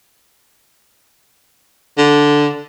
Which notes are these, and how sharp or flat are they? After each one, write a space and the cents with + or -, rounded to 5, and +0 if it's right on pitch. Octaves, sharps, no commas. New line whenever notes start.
D3 -5